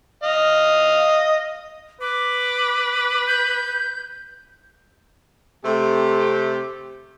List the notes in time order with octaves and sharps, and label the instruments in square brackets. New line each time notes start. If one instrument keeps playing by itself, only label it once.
[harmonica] D#5 F5
[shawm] B4 [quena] D6
[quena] G6
[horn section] C3 A3 G4